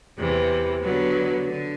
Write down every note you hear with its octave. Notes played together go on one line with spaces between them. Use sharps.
E2 C3 E3
D3 F#3 B3
D3